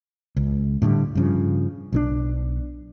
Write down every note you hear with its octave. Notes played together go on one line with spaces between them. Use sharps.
C#2
A2 D3 F3 G3
G2 C#3 F3
B1 D#3 D4